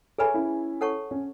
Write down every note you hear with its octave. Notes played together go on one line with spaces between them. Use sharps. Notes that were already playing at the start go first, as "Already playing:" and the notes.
G#4 A4 B4 C#5 E5 G#5 B5
C#4 E4
A4 C#5 F#5 A5 C#6
C#4